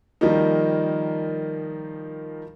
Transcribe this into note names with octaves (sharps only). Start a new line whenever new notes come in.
D#3 F3 G3 A#3 D#4